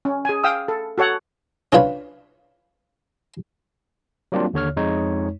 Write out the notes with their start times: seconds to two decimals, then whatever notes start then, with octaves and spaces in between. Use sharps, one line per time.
0.05 C#4
0.25 G#4 G#5
0.44 F5 G5 D#6 E6
0.68 A4
0.98 F#4 A4 C#5 F#5
1.72 C#4 D4 F4 B4 C#5
4.32 F#3 G3 A#3 C4 D4 F4
4.53 D#2 D3 C#5 F6
4.76 F2 G#3 D#4 C#5